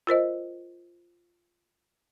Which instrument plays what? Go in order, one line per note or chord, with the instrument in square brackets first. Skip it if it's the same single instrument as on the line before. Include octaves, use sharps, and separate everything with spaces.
[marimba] F4 A#4 C5 D#5